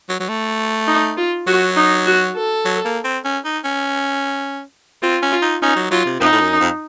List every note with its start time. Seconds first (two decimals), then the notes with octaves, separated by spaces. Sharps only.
0.09 F#3
0.20 F#3
0.29 A3
0.87 D#4
1.17 F4
1.47 F#3 F#4
1.76 D#4
2.06 F#4
2.36 A4
2.65 F#3
2.85 A#3
3.04 C4
3.25 C#4
3.45 D#4
3.64 C#4
5.02 C4 F4
5.22 C#4
5.32 F4
5.42 D#4
5.62 C#4 D#4
5.76 F#3
5.91 F#3 F4
6.05 C3
6.21 F2 D#4
6.32 A2
6.41 F#2
6.60 F2